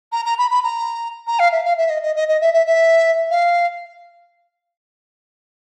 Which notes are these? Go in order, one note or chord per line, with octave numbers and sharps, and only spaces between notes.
A#5
A#5
B5
B5
A#5
A#5
F5
E5
F5
E5
D#5
D#5
D#5
D#5
E5
E5
E5
F5